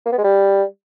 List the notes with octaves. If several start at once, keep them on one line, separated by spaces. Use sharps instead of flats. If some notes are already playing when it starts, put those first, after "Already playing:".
A#3
B3
G#3
G3